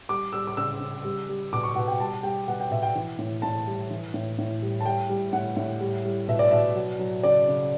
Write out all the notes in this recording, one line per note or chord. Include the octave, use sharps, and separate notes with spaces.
G3 D6
G3 E6
D6
C#3 E6
C#3
G3
G3
B2 D6
C#6
B2 F#5
G5
G3 A5
G3 G5
B2 F#5
G5
B2 E5
G5
E3
A2
A2 A5
G3
E3
A2
A2
G3
A5
G3 G5
G3
A2 F#5
A2
G3
G3
B2 E5
D5
B2 E5
F#3
F#3
C#3 D5
C#3